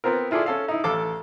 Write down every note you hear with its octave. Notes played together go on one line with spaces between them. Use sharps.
B3 C4 F4 A#4
E4 F4 G#4 A4 D5
C#4 A4 F5
D#4 E4
A1 A4 F5 D6